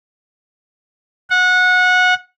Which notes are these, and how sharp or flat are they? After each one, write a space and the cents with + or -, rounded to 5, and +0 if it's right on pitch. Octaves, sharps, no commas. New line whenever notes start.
F#5 -20